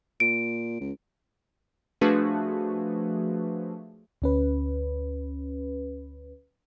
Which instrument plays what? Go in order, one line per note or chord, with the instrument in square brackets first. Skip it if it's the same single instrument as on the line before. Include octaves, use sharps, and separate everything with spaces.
[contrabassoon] A#2 [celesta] D7
[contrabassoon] C#2
[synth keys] F3 A3 D4 F#4 G#4 B4
[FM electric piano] D2 C#4 B4